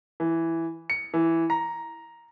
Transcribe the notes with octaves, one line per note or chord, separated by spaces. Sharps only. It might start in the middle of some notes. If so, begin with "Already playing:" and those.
E3
C#7
E3
A#5